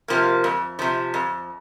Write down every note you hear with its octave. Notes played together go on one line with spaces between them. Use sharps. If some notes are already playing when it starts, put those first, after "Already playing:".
C3 F3 A#3
F2
C3 F3
F2